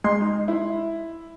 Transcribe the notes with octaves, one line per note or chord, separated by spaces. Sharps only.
G#3 C6
D#4
E4